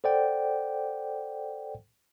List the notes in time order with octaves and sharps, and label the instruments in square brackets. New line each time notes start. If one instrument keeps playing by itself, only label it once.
[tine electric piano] A4 C5 D5 F#5 G5